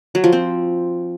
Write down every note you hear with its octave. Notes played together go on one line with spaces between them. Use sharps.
F#3
F3
C4